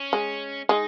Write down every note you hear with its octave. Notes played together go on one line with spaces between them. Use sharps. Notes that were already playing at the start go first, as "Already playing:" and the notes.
Already playing: C#4
G#3
G#3 D#4